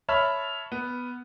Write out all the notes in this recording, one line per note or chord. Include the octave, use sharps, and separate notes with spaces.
C#5 E5 A5 B5 F6
B3